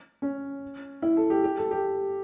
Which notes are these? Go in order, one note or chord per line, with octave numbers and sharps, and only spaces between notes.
C#4
E4
A4
G4
G4
A4
G4